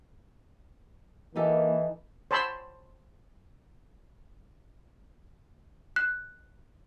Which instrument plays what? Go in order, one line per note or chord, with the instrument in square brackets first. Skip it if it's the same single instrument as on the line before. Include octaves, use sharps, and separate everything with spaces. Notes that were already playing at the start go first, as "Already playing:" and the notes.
[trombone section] E3 [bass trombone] A#3 [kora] D#4 G4 A4
[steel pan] C5 C#5 A5 B5 C6 E6
[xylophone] F#6